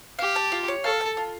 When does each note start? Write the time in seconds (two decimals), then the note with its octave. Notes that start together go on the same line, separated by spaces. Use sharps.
0.19 G4 F5
0.36 A5
0.52 F4
0.68 C#5
0.84 A4 F5
1.01 A5
1.17 F4